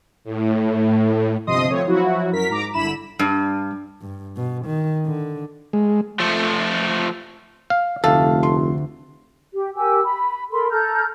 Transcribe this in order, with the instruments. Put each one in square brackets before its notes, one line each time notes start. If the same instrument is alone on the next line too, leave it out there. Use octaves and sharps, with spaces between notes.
[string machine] A2
[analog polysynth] G1 C3 F3 D#5 C6 D#6
F3 A3 C4 C#5
F3 F#3 E4 F#4
F#2 A#4 B6
G#2 A#5 D6
G1 D3 E4 B5 E7
[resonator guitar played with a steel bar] G2
[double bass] G2
B2
D#3
D3
[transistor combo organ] G#3
[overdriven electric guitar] F3 A3
[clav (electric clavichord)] F5
[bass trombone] F1 [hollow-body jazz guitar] D2 [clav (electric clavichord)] A4 [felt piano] F5
[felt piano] C6
[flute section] G4
G4 A#4 G#5 E6
B5
A4 A#4 B5 C6
A4 A#5 F6 G6